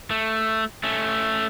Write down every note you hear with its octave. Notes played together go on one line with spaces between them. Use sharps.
A3
A3 C#4